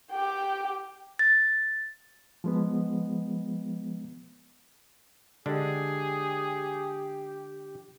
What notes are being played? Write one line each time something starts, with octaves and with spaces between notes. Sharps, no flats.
G4 G5
A6
F3 G#3 B3
D3 G#3 D4 G4 G#4